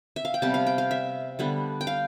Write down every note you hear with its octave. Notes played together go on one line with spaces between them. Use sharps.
E5
F5
G5
C3 G3 B3 A5
F5
G5
F5
E5
D3 G3 B3
G5
F5